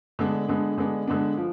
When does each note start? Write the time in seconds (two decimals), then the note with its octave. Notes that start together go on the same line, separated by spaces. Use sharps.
0.19 D3 G#3 B3 D4
0.48 D3 G#3 B3 D4
0.78 D3 G#3 B3 D4
1.07 D3 G#3 B3 D4
1.37 F3